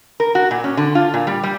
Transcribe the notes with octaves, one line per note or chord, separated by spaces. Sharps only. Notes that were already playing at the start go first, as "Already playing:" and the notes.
A#4
F#4
A#2
C#4
D3
F4
A#2
G3
G3